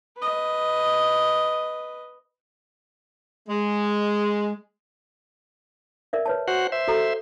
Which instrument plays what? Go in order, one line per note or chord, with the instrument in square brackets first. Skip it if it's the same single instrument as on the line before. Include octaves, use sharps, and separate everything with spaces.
[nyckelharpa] B4 D#5
[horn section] G#3
[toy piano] A#4 D5 E5
B4 C#5 A5
[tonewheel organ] F#4 C5 F#5
C5 E5
[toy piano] F#4 A4 A#5